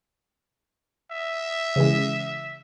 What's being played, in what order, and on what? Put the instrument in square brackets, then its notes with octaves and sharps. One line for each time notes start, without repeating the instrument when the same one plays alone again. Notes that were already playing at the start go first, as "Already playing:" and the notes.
[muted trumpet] E5
[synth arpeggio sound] C#3 E3 G#3